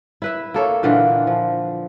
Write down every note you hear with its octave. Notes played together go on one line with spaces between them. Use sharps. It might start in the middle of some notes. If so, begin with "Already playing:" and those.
E4 B4 E5
A#3 A4 C#5
A#2 D3 E3 F4
F3